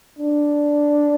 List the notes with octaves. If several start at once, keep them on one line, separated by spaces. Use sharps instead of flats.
D4